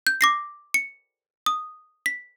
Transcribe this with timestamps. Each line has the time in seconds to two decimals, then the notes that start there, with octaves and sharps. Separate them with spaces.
0.07 G6
0.21 D6 A#6 C7
0.74 C#7
1.46 D#6
2.06 B6